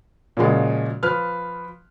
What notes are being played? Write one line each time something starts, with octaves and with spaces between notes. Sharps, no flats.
A#2 C#3 F3 G#3 F#4
F3 B4 F6